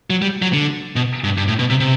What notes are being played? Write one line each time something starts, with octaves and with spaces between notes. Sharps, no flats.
F#3
G3
F#3
D3
B2
G2
G2
A2
B2
C3
C3